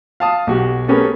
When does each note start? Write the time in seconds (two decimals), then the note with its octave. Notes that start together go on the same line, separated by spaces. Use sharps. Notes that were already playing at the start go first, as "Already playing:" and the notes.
0.20 F5 A5 D#6
0.47 B1 F#4 G4
0.88 A3 B3 C#4 G4 G#4 A#4